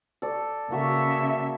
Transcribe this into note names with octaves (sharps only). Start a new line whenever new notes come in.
A4 D5
C#3 A#3 F#4 A4 E5